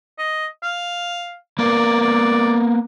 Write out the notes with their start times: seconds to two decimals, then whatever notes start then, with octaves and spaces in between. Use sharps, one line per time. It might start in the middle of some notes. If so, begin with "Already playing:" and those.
0.18 D#5
0.63 F5
1.59 A#3 B3 A#4 D5
2.01 D5